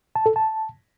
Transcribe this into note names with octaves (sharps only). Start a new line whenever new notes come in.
A5
A4
A5